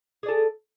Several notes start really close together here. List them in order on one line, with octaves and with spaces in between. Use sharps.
G#4 D5 A4